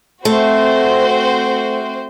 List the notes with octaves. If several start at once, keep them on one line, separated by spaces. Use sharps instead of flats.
A3 C4 F#4 C5